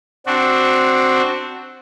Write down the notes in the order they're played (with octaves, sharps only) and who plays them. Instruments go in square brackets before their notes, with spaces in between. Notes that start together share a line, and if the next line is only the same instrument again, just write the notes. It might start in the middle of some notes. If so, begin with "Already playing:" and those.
[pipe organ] C4 D4 F#4